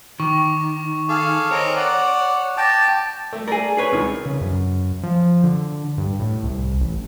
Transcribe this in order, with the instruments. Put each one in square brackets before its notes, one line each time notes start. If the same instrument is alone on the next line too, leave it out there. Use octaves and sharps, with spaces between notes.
[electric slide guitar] D#3 [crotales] C#6 D6
[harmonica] G#4 A4 F5 [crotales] D6
[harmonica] C4 D#4 A#4 [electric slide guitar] C#5
[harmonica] D5 F#5
[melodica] G5 A5 [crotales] D6 A6 A#6
[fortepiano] A3
[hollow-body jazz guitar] G#4 A#4 [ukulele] D5 G#5
[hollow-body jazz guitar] G#4 B4 C#5
[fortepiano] C#2 D#3
[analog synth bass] C#3
F#2
F3
D3
G2
A2
C2
A1